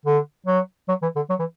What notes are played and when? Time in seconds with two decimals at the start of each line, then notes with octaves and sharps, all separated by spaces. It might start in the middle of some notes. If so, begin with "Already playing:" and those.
0.06 D3
0.46 F#3
0.88 F#3
1.03 E3
1.16 D3
1.29 F#3
1.39 E3